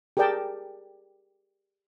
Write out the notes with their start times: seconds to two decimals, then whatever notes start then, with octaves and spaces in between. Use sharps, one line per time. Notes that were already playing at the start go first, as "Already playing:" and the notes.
0.17 G4 G#4 A#4 D5 G5 A5